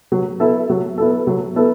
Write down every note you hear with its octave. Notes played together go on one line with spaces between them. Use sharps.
F#3
B3 E4 A4
F#3
B3 E4 A4
F#3
B3 E4 A4